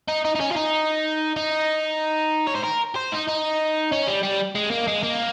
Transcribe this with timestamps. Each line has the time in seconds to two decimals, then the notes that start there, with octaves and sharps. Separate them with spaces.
0.08 D#4
0.25 D#4
0.35 D#4
0.40 C#4
0.52 F4
0.56 D#4
1.36 D#4
2.47 C#5
2.55 C5
2.64 A#4
2.95 C5
3.12 D#4
3.28 D#4
3.92 C#4
4.07 G3
4.23 G3
4.56 G#3
4.71 A#3
4.88 G#3
5.03 A#3